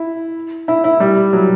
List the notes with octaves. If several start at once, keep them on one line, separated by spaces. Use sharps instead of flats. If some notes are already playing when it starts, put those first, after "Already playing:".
Already playing: E4
E4
E4
G3
F#3